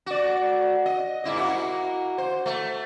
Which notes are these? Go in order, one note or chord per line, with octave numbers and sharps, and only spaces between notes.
F#4 D5
D#5
G#2 E4 D#5
A#3 E4 F#4
C5
A3